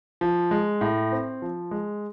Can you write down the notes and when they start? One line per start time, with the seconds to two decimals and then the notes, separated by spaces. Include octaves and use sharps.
0.21 F3
0.51 G#3
0.81 A2
1.12 C4
1.42 F3
1.71 G#3